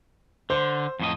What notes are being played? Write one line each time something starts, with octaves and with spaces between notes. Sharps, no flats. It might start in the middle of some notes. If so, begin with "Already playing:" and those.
D3 C5
F2 A2 D#5